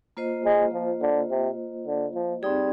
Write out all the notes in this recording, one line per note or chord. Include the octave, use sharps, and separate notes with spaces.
A#3 F4 C5 D#5
G#3
F3
D3
C3
D3
F3
G3 C4 D#4 G#4